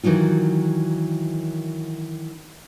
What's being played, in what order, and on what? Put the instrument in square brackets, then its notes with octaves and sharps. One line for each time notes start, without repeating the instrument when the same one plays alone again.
[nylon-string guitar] D#3 E3 F#3 D#4 F4